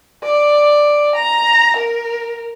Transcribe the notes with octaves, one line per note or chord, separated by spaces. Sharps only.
D5
A#5
A#4